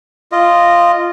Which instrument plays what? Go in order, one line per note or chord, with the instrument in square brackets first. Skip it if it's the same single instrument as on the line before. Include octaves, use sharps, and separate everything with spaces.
[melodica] F4 D#5